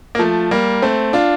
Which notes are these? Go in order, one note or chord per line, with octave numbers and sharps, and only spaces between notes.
A#3
F3 A3
G3 A#3
A3 C4
D4 F4